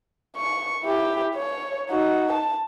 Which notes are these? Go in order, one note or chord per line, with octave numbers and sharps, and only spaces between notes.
C#6
E4 G4
C#5
D#4 F#4
A5